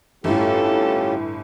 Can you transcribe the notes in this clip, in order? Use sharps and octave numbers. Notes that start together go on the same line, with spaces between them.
G1 A2 C#4 F4 G4 A4